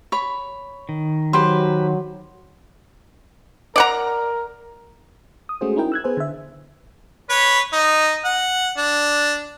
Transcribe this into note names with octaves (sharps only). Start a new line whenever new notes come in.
C#5 B5
D#3
F#3 G4 B4 C5
A#4 D5 F#5 A#5
D#6
G#3 A3 C#4 F#4 G#4 C5
C#4 D#4 E4 A#4 G5
E6 F#6 G#6
B3 G#4 B4 C5 G#5
D3 E5
B4 C#5
D#4
F#5
D4